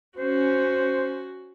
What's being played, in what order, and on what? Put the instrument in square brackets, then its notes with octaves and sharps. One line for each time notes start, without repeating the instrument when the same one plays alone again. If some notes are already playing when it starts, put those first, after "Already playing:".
[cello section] C#4 [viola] F#4 [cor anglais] C5